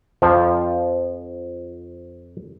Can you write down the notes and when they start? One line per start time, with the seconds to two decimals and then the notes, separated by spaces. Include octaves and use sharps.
0.22 F2 F3